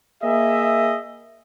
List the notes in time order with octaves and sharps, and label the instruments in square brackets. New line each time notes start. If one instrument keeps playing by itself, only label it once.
[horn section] A#3 G#4 D#5 E5